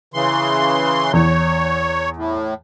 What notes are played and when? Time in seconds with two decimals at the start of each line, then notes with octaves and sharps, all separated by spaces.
0.14 C#3 E3 C6
1.13 E2 C#5
2.16 A2